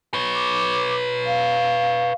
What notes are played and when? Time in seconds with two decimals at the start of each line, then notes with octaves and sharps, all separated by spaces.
0.14 B4 C#5
0.34 D6
1.26 F5